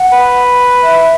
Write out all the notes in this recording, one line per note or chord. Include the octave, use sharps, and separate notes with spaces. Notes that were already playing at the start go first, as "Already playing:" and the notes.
Already playing: F#5
B4
E5